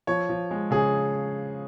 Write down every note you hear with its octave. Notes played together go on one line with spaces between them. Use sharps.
F3 C#5
F3
G#3
C#3 G#4